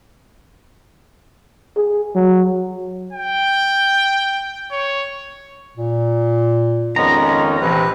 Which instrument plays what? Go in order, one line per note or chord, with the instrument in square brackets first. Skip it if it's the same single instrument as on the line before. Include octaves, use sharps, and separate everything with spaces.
[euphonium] G#4
F#3
[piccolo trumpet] G5
C#5
[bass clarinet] A#2
[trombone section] F2 D#3 C#4 [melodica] G#3 B3 [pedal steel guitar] A#5
[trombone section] A#1 C3 [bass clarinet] E3 [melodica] B4